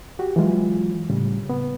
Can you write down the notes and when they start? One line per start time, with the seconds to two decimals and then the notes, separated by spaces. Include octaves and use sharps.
0.19 F#4 G4
0.36 E3 F#3 G#3 F4
1.10 A2 C#3 G3
1.50 B3